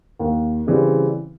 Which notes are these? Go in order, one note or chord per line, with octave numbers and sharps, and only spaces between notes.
D#2
C#3 E3 G3 C4